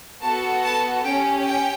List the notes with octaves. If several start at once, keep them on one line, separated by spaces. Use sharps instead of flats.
B3 F#4 A4 A5
A5
C#4 G4 G5
G5